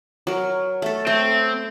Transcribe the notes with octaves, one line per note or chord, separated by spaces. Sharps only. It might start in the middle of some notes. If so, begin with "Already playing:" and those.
F#3 A#4
A3 A4
A3 C4